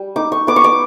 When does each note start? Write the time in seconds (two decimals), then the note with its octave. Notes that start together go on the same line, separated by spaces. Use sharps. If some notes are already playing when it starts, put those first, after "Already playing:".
Already playing: G3
0.16 D#4 D6
0.32 C#6
0.47 B3 D6
0.56 C#6
0.64 D6